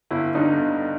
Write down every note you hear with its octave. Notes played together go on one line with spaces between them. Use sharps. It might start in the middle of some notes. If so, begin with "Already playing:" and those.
G1 E4
G2 D3 D#4
G1